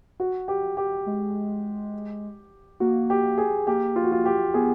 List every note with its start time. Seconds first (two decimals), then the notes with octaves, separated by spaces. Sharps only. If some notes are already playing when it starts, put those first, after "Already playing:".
0.20 F#4
0.48 G4
0.77 G4
1.06 G#3
2.80 A#3 F#4
3.10 G4
3.38 G#4
3.67 A#3 G4
3.96 F4
4.04 F#4
4.12 F4
4.26 G4
4.54 B3 G#4